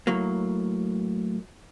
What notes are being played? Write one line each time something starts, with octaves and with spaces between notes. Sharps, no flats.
A2 F#3 A#3